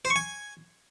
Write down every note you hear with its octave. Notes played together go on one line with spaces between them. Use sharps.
C5
C#6
G#5